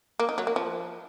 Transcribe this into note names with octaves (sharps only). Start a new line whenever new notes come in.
A#3
D#4
F#3
A#3
F3